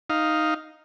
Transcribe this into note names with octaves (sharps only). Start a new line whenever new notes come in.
D#4 F5